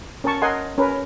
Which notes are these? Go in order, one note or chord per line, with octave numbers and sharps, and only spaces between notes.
C#4 A#4 C#5 A5 C#6
A#4 D#5 F#5 G#5 C6
C#4 A#4 B4